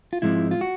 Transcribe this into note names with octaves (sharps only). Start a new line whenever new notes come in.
F4
G#2 F3 G#3 C4 E4
F4
F#4